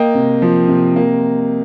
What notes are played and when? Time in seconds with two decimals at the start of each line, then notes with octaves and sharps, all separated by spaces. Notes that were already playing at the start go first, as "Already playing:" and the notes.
Already playing: A#3 D#5 G5
0.15 C3
0.42 F3
0.68 C3
0.96 A#3